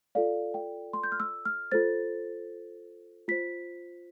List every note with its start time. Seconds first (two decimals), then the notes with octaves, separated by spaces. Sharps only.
0.15 F4 A4 D5 F5
0.54 G5
0.93 C6
1.04 G6
1.12 F6
1.20 E6
1.45 F6
1.72 F4 A4 C5 A6
3.28 F4 C5 B6